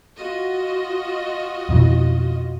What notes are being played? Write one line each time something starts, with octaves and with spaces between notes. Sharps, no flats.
F4 F#4 D#5
F2 B2 E3